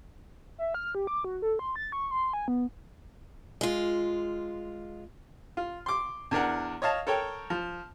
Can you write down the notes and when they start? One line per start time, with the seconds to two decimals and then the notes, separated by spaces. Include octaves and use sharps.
0.58 E5
0.74 F6
0.95 G4
1.07 D6
1.24 F#4
1.42 A4
1.59 C6
1.76 A6
1.92 C#6
2.11 C6
2.33 G#5
2.48 B3
3.61 G#3 F4
5.57 F4
5.86 C6 D6
6.31 E2 D4 A#4 F#5
6.82 C#5 D#5 F5 A5
7.07 A4 A#4 C#5 G5
7.50 F3